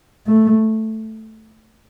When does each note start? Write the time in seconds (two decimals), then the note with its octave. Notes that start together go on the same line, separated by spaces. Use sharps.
0.27 A3